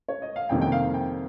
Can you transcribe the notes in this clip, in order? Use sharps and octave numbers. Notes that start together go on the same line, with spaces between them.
C#5
D#5
F5
F2 C3 D#3 G3 A#3 G5
G5
F5
G5